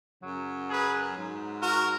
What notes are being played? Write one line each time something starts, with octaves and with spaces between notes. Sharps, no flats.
F#2 C#3 F#3
G#4 B4
G#2 F#3
F#4 A#4